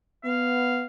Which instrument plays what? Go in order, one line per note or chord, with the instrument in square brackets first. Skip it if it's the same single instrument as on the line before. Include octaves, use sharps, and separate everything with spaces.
[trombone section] B3 [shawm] F5